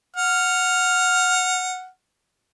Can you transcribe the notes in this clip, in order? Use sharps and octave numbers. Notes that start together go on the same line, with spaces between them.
F#5 F6